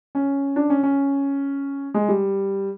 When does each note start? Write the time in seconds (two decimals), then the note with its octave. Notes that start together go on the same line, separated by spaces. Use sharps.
0.15 C#4
0.56 D4
0.70 C#4
0.83 C#4
1.94 G#3
2.08 G3